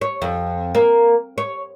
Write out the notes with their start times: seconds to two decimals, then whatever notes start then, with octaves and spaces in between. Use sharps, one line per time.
0.01 C#5
0.22 F2
0.75 A#3
1.38 C#5